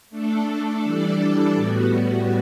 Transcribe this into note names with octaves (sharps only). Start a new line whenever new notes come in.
A3 D4 A4
E3 G3 D4 A4 D5
A2 G3 B3 F#4